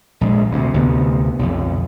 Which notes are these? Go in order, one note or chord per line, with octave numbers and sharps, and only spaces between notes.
A#1 G#3
D2 C3
D2 C3 B3
B1 F2